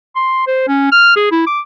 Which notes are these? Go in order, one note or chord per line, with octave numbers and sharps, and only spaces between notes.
C6
C5
C#4
F6
G#4
E4
D6